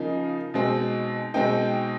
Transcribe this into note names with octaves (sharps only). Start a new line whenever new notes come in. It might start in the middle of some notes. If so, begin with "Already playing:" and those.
Already playing: C#3 F3 A#3 D#4
B2 G#3 C4 D#4
B2 G#3 C4 D#4 G5